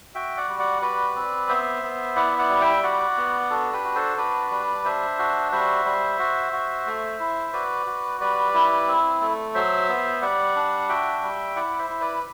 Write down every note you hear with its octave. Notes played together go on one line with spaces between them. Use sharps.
F#4 E5 G5
D5 F#5
G3
D5 F#5
F#4 B4 D5
C4
B3 C5 E5
B3
E4 D5 F#5
E5
D5 F#5
G3
E5 G5
F#4 D5 F#5
B3
D4 F#4 A4
G4 B4
F#4
A4 C5
D4 B4 D5
G3
D4 C5 E5
F#4
G3 C5 E5
G3
F#4
F#4
A3
E4
F#4 B4 D5
F#4
G3 B4 D5
E4
C4
A3
F#3 C5 E5
B3
G3 D5 F#5
D4
F#4 E5 G5
G3
E4 D5 F#5
C5 E5
E4
B4 D5